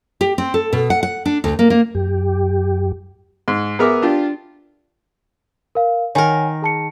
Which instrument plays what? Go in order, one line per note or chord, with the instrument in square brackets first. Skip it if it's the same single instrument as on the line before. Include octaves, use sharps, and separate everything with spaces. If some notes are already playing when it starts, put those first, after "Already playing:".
[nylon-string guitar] G4
C4
A4
B2
F#5
F#5
D4
D2
A#3
A#3
[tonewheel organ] F#2 G4
[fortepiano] G#2
B3 G#4 A#4 E5 D6
D4 F4 G4
[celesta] A#4 F5
[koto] D#3 A#4 [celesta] C#5 F#5 G#5
[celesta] G#4 A5 C#7